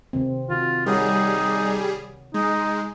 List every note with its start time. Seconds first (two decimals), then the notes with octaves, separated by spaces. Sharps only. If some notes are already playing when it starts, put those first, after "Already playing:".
0.13 C3 D#3 C4
0.50 D#3 F4 F#4
0.86 G3 D#4 G#4 A#4 C#5 F#5
2.34 G#3 D#4